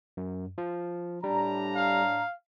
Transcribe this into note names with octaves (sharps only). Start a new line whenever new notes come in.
F#2
F3
A2 G3 D4 A#5
F5